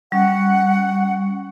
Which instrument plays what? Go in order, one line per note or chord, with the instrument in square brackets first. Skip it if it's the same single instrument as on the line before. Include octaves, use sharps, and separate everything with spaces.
[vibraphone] G3 C#4 C#6 [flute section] F#5